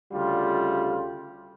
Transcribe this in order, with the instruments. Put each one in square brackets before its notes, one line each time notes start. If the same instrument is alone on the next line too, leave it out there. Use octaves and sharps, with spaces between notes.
[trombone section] D2 C#3 G3 F4